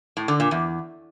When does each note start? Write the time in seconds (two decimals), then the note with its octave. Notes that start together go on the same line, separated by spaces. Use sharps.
0.17 A2
0.28 D3
0.40 A#2
0.51 E2